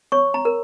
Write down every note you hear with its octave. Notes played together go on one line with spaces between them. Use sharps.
C#5 C#6
A#5
A#4